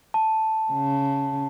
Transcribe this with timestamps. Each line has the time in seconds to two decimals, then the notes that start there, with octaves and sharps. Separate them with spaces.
0.14 A5
0.72 C#3